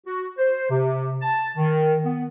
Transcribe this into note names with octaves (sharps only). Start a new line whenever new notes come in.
F#4
C5
C3
A5
D#3
B3